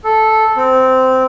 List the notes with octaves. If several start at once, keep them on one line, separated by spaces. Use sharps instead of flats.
A4
C4